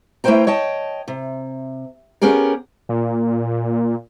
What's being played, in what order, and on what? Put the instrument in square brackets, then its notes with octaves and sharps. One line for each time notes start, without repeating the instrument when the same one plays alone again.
[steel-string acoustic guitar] A3 E4 B4 C5 G5 A#5
C#5 D#5 G5 A5
C3
B3 C#4 G4 G#4 A#4
[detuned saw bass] A#2